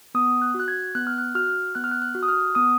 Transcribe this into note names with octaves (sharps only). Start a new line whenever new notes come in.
B3 D#6
F#6
F#4
F#6
G#6
B3 F#6
F6
F#6
F#4 F6
B3 F#6
F6
F#6
F#6
F#4
D#6
F6
B3 D#6